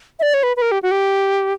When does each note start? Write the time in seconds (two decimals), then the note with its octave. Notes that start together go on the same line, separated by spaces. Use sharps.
0.19 E5
0.22 D5
0.34 C#5
0.43 B4
0.57 B4
0.62 A#4
0.72 G4
0.83 F#4
0.91 G4